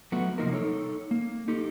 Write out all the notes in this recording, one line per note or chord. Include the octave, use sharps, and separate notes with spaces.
F#3 A3 B3 F#4
C3 F3 A#3 D#4 A#4
D#4 A4 C#5
A#3
D#4 G4 A4